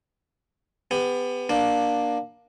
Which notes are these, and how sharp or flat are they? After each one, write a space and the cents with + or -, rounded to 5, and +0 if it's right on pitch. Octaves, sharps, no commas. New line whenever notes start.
B3 +20 G4 +40
A#3 +15 D4 +10